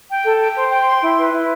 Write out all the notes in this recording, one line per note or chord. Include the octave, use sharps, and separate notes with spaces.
G5
A4
G5
C5
G5
C6
E4
B4
E4